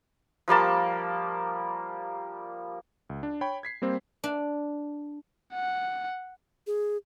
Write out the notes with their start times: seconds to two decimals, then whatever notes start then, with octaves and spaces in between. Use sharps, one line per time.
0.48 F3 G3 A#3 A5
3.10 C#2
3.23 D4
3.41 C#5 G5 B5
3.63 G#6 B6 C7
3.82 G3 A#3 C4 C5
4.24 D4
5.53 F#5
6.67 G#4